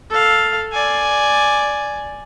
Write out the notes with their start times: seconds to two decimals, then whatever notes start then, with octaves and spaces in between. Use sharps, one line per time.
0.10 A4 F5
0.72 D5 G#5